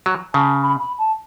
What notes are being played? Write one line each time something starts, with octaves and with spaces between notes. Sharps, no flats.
F#3
C#3 A5
B5
B5
A5